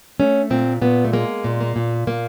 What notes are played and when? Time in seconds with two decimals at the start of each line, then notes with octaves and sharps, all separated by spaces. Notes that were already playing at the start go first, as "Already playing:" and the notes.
0.20 A3 C#4
0.50 A#2 C4
0.81 A#2 B3
1.05 A3
1.13 G#3 A#3
1.44 A#2
1.60 A#3
1.76 A#2
2.07 A#2 A#3